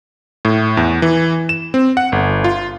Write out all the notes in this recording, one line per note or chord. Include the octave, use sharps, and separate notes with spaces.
A2
E2
E3
E7
C4
F#5
G1
F4